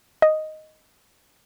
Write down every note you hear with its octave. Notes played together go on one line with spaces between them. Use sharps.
D#5